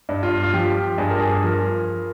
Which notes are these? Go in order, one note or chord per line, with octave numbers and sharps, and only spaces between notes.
G2
F4
F4
F3 G4
G2 G#4
A#4
G#4
F3 A#4